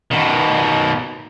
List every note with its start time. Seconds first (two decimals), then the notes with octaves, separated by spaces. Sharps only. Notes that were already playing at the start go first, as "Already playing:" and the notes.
0.11 B2 D#3